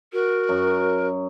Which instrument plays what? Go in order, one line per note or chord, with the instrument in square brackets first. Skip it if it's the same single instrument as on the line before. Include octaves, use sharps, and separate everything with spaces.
[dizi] F#4 [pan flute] A#4
[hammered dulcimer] F#2